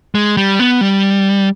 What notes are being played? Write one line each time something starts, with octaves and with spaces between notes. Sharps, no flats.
G#3
G3
B3
G3